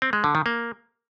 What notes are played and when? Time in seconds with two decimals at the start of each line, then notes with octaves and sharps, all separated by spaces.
0.02 C4
0.13 G#3
0.24 D3
0.35 D#3
0.46 A#3